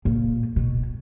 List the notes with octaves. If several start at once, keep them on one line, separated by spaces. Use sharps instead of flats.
A#2
B2